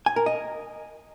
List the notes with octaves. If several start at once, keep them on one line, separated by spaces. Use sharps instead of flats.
G#5
A#4
D#5